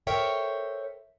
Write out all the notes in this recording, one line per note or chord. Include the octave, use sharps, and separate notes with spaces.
A4 A#4 C5 C#5 E5 G5